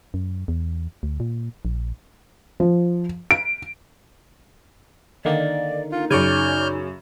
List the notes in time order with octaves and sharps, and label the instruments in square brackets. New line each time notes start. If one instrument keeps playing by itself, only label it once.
[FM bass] F#2
E2
D2
A#2
A#1
[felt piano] F3
D7
[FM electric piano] D3 D#3 A#3 [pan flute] D5
[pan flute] D#4 [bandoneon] F4
[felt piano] F#2 C#3 [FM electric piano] C#5 D5 G#5 [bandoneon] F6 G6